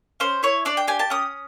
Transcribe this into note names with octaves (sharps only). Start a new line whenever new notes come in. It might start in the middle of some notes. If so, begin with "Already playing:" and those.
C#4 C5
E4 C#5
D4 D5
G5
G4 G#5
A5
C#4 D#6